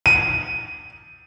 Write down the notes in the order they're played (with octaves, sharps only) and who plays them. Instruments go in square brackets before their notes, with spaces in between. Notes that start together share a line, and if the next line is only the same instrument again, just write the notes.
[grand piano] D#7